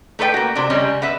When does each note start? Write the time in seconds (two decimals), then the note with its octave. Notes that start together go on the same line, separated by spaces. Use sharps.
0.19 A3 A4 B4 D5 G5
0.34 A#3 F#4
0.55 C3 D4
0.70 C#3 G3 G#3 C#4
1.02 B3 B4 E5